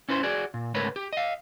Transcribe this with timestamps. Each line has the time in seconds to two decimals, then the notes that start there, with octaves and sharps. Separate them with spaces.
0.09 C#4 E4 B4 C5
0.23 F#4 G#4 D5
0.54 A#2
0.74 C#2 G#2 A3 A#4 B4 C#5
0.96 G4
1.13 D#5 F5